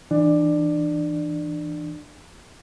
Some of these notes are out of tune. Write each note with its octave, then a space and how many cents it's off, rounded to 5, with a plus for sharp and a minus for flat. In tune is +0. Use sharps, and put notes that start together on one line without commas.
E3 +0 D4 +30 D5 +15